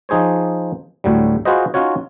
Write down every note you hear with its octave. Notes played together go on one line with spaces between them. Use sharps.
F3 D#4 G#4 C5 C#5
D2 A2 F#3 G3
F4 F#4 G#4 B4 C5 D#5
C#4 D#4 F4 F#4 C#5